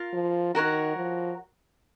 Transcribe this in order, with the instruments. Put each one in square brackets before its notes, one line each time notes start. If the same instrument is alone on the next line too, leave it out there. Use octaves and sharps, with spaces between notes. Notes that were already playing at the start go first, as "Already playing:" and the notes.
Already playing: [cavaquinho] F4 A#4 F5
[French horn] F3
[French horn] D#3 [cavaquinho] F#4 A#4 C#5 F#5
[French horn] F3